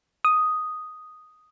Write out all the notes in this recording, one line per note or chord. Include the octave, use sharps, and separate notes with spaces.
D#6